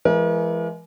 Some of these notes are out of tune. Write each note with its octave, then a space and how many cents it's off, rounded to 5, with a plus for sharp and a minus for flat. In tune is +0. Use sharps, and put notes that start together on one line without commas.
E3 +40 G#3 +20 A#4 +40